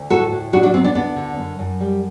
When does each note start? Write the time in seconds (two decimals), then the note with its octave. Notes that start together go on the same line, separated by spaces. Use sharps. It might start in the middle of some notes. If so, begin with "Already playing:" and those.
Already playing: D2
0.10 A2 F#4 A4
0.31 A2
0.52 F#3 D4 F#4
0.63 D4 F#4
0.74 B3 C4
0.84 B3 D4
0.95 D2 B3 D4
1.16 D3
1.37 F#2
1.59 F#2
1.80 G3